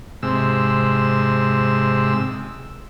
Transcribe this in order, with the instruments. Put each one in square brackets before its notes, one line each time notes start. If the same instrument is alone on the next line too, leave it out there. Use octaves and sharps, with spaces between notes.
[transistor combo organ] G#2 C3 E6